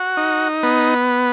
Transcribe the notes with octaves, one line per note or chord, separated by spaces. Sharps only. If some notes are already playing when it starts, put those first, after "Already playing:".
Already playing: F#4
D#4
B3